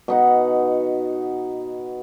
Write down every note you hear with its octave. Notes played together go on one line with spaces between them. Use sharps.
B2 D#4 F#5